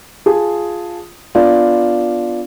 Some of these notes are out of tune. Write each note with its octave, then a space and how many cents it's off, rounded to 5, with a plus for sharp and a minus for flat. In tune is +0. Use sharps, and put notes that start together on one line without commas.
F4 +0 G#4 +0 A5 +0
B3 +5 D4 +0 F4 +0